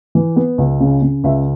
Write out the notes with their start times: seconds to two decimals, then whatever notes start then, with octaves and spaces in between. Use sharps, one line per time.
0.15 E3
0.36 B3
0.58 C#2
0.81 C#3
1.02 C#3
1.24 C#2 E5